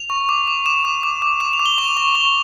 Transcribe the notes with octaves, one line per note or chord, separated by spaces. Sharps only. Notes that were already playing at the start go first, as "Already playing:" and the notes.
Already playing: F7
C#6
D6
D6
D6 E7
D6
D6
D6
D6 E7
F7
D6
G7
C#6 F7
C#6
C#6 G7